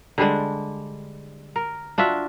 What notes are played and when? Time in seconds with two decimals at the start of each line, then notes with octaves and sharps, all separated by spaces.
0.18 D3 G3 G#3 D4
1.56 A#4
1.98 D4 F4 F#4 E5